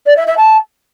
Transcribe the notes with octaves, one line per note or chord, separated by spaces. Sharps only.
D5
E5
E5
A5